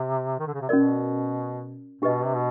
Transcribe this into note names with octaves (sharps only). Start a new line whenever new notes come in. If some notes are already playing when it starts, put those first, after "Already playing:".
Already playing: C3
D#3
D3
C#3
C3
B2 C#4 F#4 A#4 D5
B2 D4 G4 B4 D#5
C3
B2